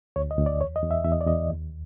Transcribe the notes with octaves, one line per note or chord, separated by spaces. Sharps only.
D2 C#5
D#5
D2
D5
E2 C#5
D#5
E2
E5
E2 E5
D#5
D5
E2 D#5
D#2